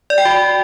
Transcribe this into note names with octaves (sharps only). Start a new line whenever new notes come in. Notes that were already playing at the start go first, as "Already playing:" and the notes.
D5
G5
F#4